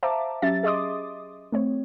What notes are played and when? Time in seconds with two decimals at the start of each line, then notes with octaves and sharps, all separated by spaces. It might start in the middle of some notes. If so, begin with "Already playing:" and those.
0.03 C5 E5 F5 A5 A#5 D6
0.42 F#3 C#4 G4 E5 A6
0.63 G#4 D#5 C6 D6 D#6
1.52 A3 C4 C#5